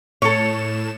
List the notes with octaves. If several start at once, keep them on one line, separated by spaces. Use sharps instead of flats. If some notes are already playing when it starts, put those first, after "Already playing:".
A2 A4 C#5 E7